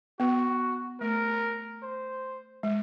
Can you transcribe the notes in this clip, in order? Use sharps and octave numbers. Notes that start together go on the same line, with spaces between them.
B3 F#4
A3 A#4
C5
G#3